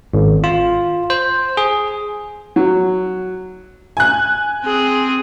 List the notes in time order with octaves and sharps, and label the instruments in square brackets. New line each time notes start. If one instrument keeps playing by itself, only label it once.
[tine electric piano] G#1
F4
C5
G#4
[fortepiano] F#3
[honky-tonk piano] G#5 F#6
[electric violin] C4 G#4